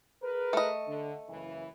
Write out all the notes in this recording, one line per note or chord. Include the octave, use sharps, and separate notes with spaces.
G#4 A#4 B4
A3 D#5
D3
F#1 C#3 E3